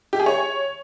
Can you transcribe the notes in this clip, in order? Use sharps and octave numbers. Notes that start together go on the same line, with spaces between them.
G4
G#4
C#5